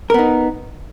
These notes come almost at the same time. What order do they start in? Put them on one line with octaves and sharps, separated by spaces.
A#4 B3 D#4